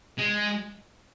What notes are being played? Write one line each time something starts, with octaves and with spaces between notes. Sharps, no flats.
G#3